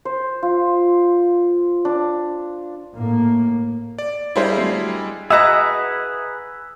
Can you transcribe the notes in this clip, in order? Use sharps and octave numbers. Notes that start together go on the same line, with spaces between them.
C5
F4
D4
A2 A#3
D5
G3 G#3 D4 E4 C5 F5
F#3 A3 C7
E4 F#4 G#4 B4 D#5 A#5 E6